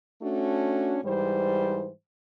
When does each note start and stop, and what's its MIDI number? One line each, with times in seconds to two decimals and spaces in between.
0.22 0.99 57
0.22 0.99 61
0.22 0.99 62
0.22 0.99 66
1.03 1.90 44
1.03 1.90 52
1.03 1.90 55
1.03 1.90 72